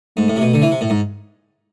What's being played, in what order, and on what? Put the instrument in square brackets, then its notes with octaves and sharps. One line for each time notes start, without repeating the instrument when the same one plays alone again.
[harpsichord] G#2 [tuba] A3
[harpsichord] A2
C3
B2
D3
E3
C3
A2
G#2